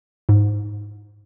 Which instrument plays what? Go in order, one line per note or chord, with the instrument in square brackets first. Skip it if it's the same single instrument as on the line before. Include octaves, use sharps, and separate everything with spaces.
[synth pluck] G#2